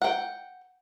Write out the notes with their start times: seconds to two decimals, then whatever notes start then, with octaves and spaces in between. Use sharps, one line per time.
0.02 F#5 G5